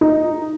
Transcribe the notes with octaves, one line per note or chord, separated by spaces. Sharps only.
D#4